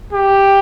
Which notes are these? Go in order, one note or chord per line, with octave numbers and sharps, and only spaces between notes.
G4